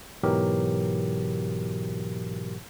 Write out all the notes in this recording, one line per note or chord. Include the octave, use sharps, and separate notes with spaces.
G#2 B2 E3 F#3 G4 A#4